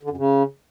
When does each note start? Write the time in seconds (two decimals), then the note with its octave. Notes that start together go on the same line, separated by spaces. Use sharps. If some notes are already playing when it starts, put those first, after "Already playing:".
0.03 D3
0.10 F#2
0.17 C#3